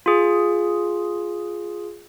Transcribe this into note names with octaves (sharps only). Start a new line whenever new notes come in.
F4 G#4